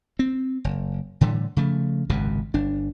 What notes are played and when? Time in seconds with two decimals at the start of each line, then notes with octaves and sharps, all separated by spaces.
0.19 C4
0.64 F#1
1.21 A2 D3 E3 G3
1.57 C#3 F3 A3
2.10 G#1 C#2 F#2 C3
2.54 G1 D4